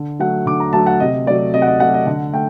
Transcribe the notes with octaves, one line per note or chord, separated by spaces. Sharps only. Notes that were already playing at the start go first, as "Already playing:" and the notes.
Already playing: D3
F#3 A3 F#5
D3 D6
A#5
F#3 A3 A5
F#5
C3 D#5
F#3 A3 D5
C3 D#5
F#5
D#5
F#3 A3 F#5
D#5
D3 F#5
A3 G5